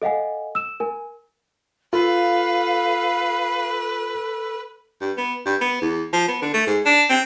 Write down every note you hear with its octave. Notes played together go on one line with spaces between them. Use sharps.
A4 D#5 F5 F#5 G#5
E6 E7
A#4 G#5
F4 A4 B4 F5
G2
B3
G2
B3
E2
F3
B3
D3
A3
G#2
D4
C4